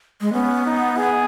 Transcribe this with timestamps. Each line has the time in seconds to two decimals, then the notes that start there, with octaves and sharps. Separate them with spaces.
0.21 G#3
0.33 B3 C#4
0.66 D#4
0.97 G#4